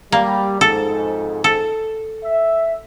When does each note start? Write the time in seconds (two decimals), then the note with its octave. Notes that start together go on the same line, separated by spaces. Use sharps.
0.12 G3 A#3
0.61 F2 G#2 A4
1.44 A4
2.24 E5